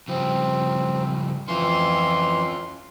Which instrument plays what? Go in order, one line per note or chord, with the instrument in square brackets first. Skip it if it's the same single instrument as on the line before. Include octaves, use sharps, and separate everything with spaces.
[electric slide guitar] C#3 F3 G3 [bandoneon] C4
[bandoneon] F2 E3 C6 [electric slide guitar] C#4 F4